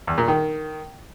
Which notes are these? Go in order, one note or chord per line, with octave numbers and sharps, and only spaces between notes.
E2
A#2
D#3